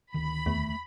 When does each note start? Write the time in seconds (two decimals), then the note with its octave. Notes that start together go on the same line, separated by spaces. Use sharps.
0.14 D1 D2 D#3 B5
0.46 E2 A3